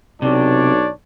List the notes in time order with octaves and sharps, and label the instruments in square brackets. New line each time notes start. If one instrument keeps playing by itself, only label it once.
[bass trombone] B1 [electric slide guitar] C3 [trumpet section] D4 C#5 D5